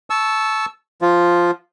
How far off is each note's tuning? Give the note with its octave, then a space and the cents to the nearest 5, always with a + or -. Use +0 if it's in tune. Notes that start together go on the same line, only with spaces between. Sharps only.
A5 -20 C#6 +0 E6 +0
F3 +0 F4 +0